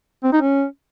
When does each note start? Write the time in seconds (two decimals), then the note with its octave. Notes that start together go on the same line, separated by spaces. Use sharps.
0.23 C4
0.32 D#4
0.41 C#4